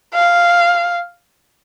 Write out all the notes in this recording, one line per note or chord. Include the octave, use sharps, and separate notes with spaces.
F5